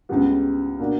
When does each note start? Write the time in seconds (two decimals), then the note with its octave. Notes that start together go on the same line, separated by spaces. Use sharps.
0.09 C#2 C#3 G3 B3
0.80 B2 A#3 D4